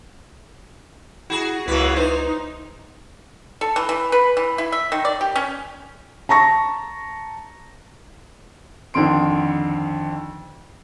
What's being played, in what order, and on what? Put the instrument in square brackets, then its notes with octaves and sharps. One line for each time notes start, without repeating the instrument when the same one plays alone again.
[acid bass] E4 [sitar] F#4 G#4
[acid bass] C#2 [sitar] C#3 A#3 B4 [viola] E3 F#4
[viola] D#4 [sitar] C5
[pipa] A4
E3
E3
B4
E3
E4
E5
D#3
D5
G4
C#4
[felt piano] A5 A#5 C#6 A#6
[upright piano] F2 D3 D#3 C6 D7